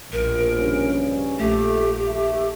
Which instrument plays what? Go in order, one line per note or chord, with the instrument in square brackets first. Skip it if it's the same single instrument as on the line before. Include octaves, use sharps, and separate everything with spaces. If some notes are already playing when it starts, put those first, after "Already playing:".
[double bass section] A#1 B2 F3 [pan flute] A#4
[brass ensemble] G2 C#3 C#4
[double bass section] A#1 [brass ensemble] A3 [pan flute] G4
[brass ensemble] D#2 A3 E5